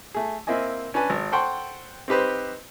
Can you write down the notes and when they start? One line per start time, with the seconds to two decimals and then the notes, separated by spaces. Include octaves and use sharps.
0.14 A3 G#4
0.47 A#3 C4 E4 D#5 G#5
0.94 C#4 D4 B4 G#5
1.10 G#1
1.32 A4 C5 F#5 G5 C6 C#6
2.08 C4 D#4 G4 B4 C5